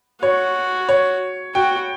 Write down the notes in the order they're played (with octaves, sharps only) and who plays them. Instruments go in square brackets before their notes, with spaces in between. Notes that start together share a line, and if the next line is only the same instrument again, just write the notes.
[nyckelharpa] F#4 [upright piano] C#5
[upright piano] C#5
[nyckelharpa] F#4 [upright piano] G5